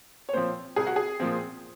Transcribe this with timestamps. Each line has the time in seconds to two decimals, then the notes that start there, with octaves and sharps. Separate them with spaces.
0.29 C#5
0.33 A#2 F3 C4 C5
0.76 C2 G#4
0.87 F#4
0.96 G#4
1.20 A#2 F3 C4